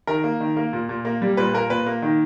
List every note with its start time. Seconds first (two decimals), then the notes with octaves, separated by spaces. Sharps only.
0.07 D#3 A#4
0.24 A#3
0.40 D#3
0.57 A#3
0.73 A#2
0.89 A#2
1.05 A#3
1.22 G3
1.37 A#2 B4
1.53 A#3 A#4
1.70 A#2 B4
1.86 A#3
2.02 D#3